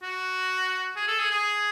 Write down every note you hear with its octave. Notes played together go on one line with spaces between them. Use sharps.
F#4
G#4
A4
G#4
G#4